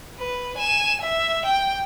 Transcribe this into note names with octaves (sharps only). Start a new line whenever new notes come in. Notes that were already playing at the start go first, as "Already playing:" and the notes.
B4
G#5 E7
E5
G5